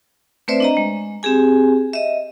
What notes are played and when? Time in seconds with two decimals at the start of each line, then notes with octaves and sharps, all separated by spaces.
0.48 A3 C4 B4 C5 D5 E5
0.60 D4 D#5 A#5
0.77 G#3
1.23 C4 G4 G#4 G#5
1.93 D#5 E5